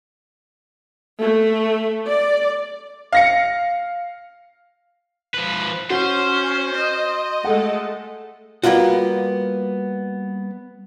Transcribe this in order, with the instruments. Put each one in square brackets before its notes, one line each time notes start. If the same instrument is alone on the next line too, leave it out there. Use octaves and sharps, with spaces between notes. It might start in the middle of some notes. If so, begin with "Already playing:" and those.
[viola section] A3
D5
[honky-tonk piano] F5 A#6 C#7
[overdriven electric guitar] F3 B4
[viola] C#4 [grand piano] F#4 [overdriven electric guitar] C5
[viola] D#5
[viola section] G#3 A3 A4 [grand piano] F#5
[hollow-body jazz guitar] G3 A#3 B3 F4 F#4